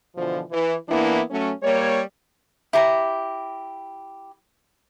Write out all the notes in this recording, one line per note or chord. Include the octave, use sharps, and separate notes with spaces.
B2 D3 E3 F3
E3
E3 A#3 B3 D4 E4
F#3 A3 C#4
G3 A#3 C#5
E4 G4 A#5